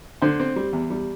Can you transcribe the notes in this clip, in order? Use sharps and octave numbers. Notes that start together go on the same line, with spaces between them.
D3 C5
C4
G3
E2
G3